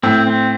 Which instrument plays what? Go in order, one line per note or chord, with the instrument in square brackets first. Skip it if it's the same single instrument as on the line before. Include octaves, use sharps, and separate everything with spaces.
[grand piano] A2 [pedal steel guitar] C4
[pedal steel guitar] C4